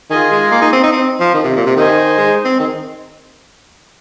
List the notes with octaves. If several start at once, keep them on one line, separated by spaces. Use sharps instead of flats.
D#3 F4 G#4 D#5 G#5
G#3
A#3
D#4
C4
D#4
C4
F3
D#3
C3
A#2
C3
D#3 D#4 C5 D#5 G#5
G#3
C4
D#3